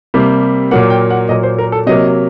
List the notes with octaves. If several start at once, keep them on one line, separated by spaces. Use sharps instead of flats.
C3 G3 A#3
A#2 F#3 A#3 F#5
G5
F#5
A#2 F#3 A#3 D#5
C5
A#4
A4
C3 F#3 A#3 D#5